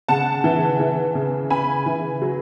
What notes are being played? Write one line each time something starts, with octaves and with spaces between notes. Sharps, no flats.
C#3 F#5 A5
E3
E3
C#3
C#3 G#5 B5
E3
F#3